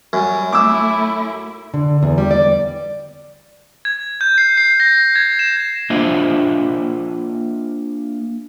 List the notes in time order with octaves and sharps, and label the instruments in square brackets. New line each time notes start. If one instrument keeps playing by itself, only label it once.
[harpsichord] F#2 [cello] G3
[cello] A3 E4 [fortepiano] D6 E6
[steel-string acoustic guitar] D3
E2
G3
D5
[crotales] G#6
G6
C7
C7
A#6
G#6
E7
[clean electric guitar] A#3 D4 F4 C5 D#5 E5